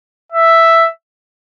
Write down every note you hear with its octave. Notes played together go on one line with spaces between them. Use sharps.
E5